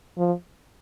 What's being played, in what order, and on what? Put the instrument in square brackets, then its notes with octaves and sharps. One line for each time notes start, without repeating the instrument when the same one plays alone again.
[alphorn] F3